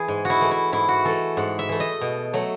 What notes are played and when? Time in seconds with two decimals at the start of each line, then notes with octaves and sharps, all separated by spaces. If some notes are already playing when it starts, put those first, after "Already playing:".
Already playing: E3 G#4
0.08 G#2
0.25 E4 F#4
0.41 E3 A3
0.51 E4
0.72 G#2 E4
0.89 F#4
1.05 E3 A3 A4
1.37 G#2 F#5
1.59 E5
1.69 E3 A3
1.80 D#5
2.01 B2
2.33 F#3 A3